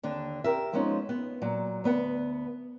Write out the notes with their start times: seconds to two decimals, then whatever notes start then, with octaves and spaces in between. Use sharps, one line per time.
0.03 D#2 D3 D4
0.44 G4 A#4 E5
0.73 F3 G#3 B3 C#4 D#4
1.09 B3
1.42 A#2 F#3
1.84 D2 B3 B4 F#5